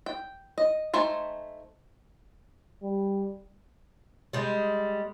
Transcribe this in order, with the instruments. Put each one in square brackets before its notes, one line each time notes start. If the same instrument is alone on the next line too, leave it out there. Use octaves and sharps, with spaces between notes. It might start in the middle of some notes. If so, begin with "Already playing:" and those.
[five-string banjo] G5
D#5
A3 D#4 C5 G#5
[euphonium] G3
[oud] G3 G#3